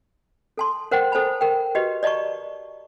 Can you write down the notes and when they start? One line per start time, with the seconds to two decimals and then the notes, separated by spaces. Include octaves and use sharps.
0.58 A4 A5 C6
0.91 A#4 C5 F#5 G5
1.12 A4 C5 G#5 A5 B5
1.41 A#4 G5
1.75 F#4 G4 B4 D#5
2.03 D5 D#5 A5 A#5 C#6